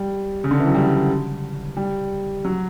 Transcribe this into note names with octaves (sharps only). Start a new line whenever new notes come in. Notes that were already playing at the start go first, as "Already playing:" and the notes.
Already playing: G3
C#3
D3
E3
F#3
G3
G3
F#3